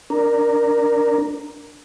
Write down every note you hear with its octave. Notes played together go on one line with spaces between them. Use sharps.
D4 A#4